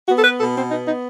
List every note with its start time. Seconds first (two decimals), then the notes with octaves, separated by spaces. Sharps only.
0.08 B3 F#4
0.18 A4
0.24 B4
0.40 B2 A4
0.56 C4
0.71 B3 D#4
0.88 D#4